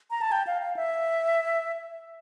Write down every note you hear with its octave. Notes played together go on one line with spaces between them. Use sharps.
A#5
A5
G5
F5
F5
E5